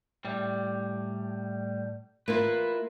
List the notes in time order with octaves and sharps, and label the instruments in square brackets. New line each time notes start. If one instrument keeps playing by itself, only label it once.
[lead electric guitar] A2 G3
[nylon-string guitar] A#3 F4 [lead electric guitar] E4 B4